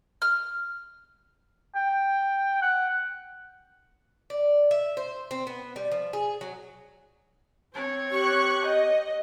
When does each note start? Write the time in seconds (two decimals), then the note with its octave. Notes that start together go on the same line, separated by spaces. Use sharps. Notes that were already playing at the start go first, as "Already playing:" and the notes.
0.22 F6
1.75 G5
2.62 F#5
4.30 D5
4.71 E5
4.97 C5
5.31 C4
5.47 B3
5.76 G3
5.92 F3
6.13 G#4
6.41 F#3
7.74 C4 C#5
8.11 G4 C#6 F#6
8.65 D#5